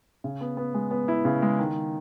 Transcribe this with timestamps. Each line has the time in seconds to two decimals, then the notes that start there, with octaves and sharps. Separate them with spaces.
0.24 C#3
0.41 B3
0.57 B3
0.74 G#3
0.91 B3
1.08 E4
1.25 C#3
1.42 G#3
1.59 D#3